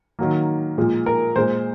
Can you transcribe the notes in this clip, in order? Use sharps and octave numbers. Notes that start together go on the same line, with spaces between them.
D#3 F#3 A#3
A#2 F3 G#3
A#4
A#2 G#3 C5